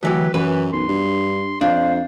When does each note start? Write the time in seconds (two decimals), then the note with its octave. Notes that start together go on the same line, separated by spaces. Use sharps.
0.03 D2 E3 F#3 G4 B4
0.34 F#2 E3 B4
0.73 B1 C6
0.88 G2
1.61 F2 D4 C5 F5